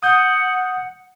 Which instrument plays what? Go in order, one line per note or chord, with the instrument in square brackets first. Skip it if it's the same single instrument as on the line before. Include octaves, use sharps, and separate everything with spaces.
[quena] F#5 [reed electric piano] D#6 G6